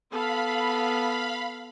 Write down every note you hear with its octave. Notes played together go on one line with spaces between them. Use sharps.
B3 A4 F5 B5